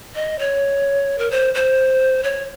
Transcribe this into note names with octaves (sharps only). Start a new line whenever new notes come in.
D#5
C#5
A#4
C5
C5
C#5